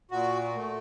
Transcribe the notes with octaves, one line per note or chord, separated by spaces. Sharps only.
A#2 F#4
A3